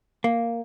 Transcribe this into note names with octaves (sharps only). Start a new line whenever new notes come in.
A#3